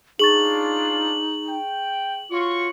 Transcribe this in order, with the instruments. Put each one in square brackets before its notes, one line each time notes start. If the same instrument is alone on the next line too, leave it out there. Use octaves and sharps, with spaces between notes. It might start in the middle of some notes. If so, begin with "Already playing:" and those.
[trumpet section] D4 F4 [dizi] D#4 [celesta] G#4 C#6 A6 [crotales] F#7
[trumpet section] G5
[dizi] F4 [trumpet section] F#4 C#5 C#6